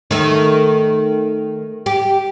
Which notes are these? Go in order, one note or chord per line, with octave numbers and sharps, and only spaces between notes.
D#3 A3
G4